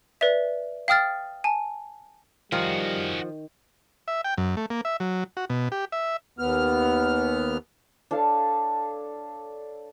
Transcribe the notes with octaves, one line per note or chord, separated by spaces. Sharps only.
B4 D5 E5
F5 G5 D#6 F6 A6
G#5 A5
D#3 F3 G3 F#4 G#4
E5
G5
F#2
A3
A#3
E5
F#3
F#4
B2
G4
E5
D#2 B3 F6
D4 A4 C#5 F5